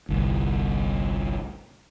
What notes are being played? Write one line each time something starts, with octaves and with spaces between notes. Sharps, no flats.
G1 C2